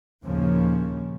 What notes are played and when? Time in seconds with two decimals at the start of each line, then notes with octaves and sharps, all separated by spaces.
0.23 A#1 D#2 C#3 F3 A#3 C#4